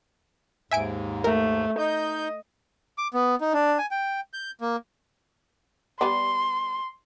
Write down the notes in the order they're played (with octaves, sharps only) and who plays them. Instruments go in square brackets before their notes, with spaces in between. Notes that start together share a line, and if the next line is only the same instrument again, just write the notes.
[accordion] D#2 G#2 [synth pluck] E5 G#5 D7
[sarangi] A3 [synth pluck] A#4
[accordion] D#4 G6 [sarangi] D#5
[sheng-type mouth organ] D6
B3
D#4
D4
G#5
G5
G6
A#3
[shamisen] G3 B3 D5 [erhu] C6